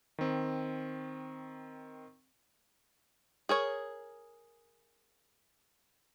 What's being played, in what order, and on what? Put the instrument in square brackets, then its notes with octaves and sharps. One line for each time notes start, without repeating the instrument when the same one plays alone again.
[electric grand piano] D#3 C4
[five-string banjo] G#4 A#4 C#5